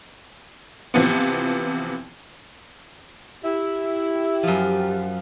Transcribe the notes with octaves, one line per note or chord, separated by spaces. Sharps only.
C3 E3 F3 B3
E4 G4
F#2 F3